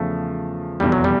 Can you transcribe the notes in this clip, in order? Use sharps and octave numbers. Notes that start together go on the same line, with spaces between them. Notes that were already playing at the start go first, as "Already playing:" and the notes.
Already playing: E2 C#3 F3 A3
F1 E2 B2 G3
F#3
G3